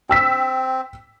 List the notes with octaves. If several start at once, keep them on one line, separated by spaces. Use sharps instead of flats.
C4 G5 E6 B6